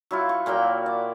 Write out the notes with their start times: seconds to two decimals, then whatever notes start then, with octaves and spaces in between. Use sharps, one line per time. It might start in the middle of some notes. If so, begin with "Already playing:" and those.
0.11 F#3 E4 F4
0.29 C#6
0.46 A#2 F#3 A#3 G5
0.86 D5